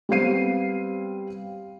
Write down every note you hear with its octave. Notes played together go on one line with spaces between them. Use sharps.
G3 B3 C4 F5 C7 D#7